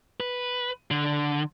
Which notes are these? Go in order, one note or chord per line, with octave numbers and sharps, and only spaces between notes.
B4
D3